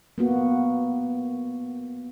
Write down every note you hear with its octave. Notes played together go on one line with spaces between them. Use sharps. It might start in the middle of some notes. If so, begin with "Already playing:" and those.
A#3 B3 F#4